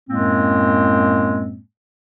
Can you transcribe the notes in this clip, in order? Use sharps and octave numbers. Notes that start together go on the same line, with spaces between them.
F#2 A2 G#3 A#3 C4